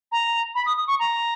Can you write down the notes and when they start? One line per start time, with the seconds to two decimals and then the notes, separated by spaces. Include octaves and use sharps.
0.12 A#5
0.55 B5
0.66 D#6
0.77 D#6
0.87 C#6
0.99 A#5